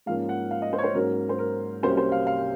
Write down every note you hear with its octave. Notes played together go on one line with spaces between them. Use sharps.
G#2 F3 A#3 C#4 F5
F#5
F5
D#5
C5
C#5
C5
G#2 F#3 A#3 C#4 A#4
C5
A#4
C2 C3 F#3 A#3 C#4 C5
C5
F5
F5